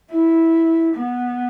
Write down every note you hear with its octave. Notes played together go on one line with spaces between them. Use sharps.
E4
B3